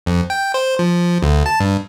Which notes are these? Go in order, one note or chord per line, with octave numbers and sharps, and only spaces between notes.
F2
G5
C5
F3
D2
A5
G2